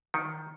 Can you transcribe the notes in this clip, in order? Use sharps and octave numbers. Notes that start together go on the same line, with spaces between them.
D#3